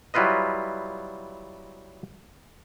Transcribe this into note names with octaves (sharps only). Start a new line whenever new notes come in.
F#3 G3 E4 F4 B4 D#5